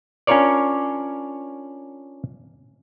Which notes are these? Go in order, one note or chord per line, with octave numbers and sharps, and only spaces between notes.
C#4 D4 F4 A#4 C#5 D5